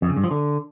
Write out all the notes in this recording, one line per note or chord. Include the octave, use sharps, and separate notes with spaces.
F2
C#3
G2
F3
D3